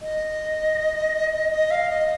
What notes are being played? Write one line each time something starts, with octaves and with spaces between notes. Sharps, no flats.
D#5
D#5
F5
D#5